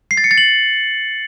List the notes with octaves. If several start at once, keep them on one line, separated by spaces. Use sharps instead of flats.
C7
A6
C#7
A6
F#7